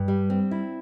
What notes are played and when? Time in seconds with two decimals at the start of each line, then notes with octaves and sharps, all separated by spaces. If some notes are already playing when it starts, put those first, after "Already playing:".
Already playing: G2
0.08 G3
0.30 C4
0.51 E4